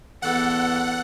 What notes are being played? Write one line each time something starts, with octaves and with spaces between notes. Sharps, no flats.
E2 A4 F#5